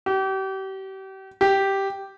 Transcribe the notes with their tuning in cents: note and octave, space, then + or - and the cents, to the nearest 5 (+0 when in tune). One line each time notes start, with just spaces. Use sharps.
G4 -35
G4 -5